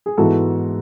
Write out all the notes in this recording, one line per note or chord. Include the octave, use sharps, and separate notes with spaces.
G#4
G#2 E3 B3 F#4 A4